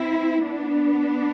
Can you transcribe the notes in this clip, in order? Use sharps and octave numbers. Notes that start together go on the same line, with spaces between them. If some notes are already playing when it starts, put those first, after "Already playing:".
Already playing: C4 E4
B3 D4